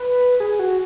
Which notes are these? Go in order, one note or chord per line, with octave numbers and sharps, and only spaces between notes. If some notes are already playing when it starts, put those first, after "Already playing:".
Already playing: B4
G#4
F#4